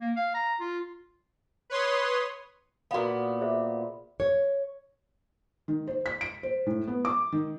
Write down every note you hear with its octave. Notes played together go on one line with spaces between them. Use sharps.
A#3
F5
A#5
F4
B4 C#5 C6 D#6
A#2 B3 F#4 F5
G#4 C5 E5
C#5
D#3
C5
B6
D7
C5
A2
B3
D6
D#3